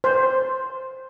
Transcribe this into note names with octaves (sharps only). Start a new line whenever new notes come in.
C5